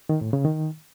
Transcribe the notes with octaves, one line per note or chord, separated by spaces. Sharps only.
D#3
A2
C#3
D#3